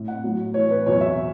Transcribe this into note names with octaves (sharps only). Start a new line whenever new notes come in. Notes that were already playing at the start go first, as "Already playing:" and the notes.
Already playing: A2
F#5
A2 F#3
A2 E3 C#5
B4
E2 B2 F#3 C#5
E5